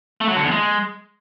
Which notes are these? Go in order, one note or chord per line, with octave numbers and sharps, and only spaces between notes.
A3
F#3
D3
E2
G#3